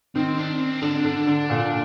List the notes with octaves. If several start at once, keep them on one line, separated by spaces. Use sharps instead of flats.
D#3 C4
D4
C4
D3 D4
D3
D3
A#2